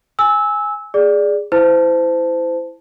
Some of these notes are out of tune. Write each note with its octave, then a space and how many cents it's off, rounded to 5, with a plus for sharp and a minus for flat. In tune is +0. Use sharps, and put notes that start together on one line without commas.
G#5 +0 E6 -15
G#4 +0 D5 +0
E4 +0 C5 -30 A5 +0